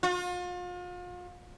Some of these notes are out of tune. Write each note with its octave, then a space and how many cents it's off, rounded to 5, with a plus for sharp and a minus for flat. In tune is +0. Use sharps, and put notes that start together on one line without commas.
F4 +40